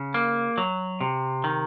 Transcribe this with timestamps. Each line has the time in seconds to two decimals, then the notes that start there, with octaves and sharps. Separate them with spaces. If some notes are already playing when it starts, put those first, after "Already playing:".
Already playing: C#3
0.14 A#3
0.58 F#3
1.01 C3
1.44 D#3